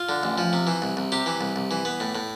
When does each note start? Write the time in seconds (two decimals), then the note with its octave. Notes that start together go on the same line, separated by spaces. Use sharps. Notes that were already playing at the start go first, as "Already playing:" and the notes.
Already playing: F4
0.09 D3
0.23 A1
0.38 F3
0.53 C3
0.67 E3
0.82 C2
0.97 C2
1.12 C3 G4
1.26 E3
1.41 C2
1.56 C2
1.71 E3
1.85 B3
2.00 A2
2.15 A2